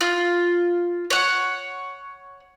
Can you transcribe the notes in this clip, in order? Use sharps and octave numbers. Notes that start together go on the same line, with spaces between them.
F4
C#5 F#5